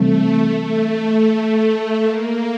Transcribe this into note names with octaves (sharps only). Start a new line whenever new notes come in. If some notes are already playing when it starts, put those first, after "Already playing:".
Already playing: C3 E3 G3 A3 C4
A3
A#3